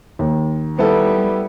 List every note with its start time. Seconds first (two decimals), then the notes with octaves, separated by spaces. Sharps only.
0.19 D#2
0.78 G3 B3 E4 A4